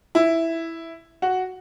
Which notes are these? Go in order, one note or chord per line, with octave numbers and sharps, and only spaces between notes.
E4
F#4